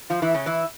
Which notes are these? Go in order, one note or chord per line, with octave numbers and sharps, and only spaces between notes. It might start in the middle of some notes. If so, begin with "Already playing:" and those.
F3 F4
E3 E4
C#3 C#4
E3 E4